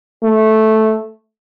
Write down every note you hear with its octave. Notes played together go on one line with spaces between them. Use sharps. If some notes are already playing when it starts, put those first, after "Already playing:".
A3